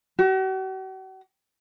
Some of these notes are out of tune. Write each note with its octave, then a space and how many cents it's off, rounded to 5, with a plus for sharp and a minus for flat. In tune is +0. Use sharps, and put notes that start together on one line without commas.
F#4 +45